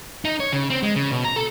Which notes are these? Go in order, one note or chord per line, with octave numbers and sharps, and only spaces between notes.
D#4
C#5
C#3
C4
G#3
C#3
B2
A#5
A4